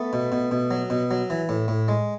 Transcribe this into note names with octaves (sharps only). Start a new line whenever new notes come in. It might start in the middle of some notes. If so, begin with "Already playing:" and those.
Already playing: A3 B3
B2
B2
B2
F#3
B2
F#3
E3
A2
A2
G#3